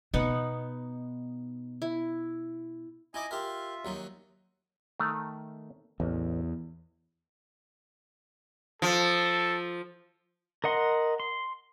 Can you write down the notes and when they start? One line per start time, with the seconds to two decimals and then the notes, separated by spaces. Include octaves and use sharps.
0.14 B2 B3 D#4 F#5
1.82 E4
3.14 D#4 E4 D#5 G#5 D6
3.31 F4 G4 A#4 E5
3.85 D#2 F#3 D#4
5.00 D#3 A3
6.00 A1 E2
8.82 F3 A4
10.64 A#4 D#5 F#5 C6
11.20 C6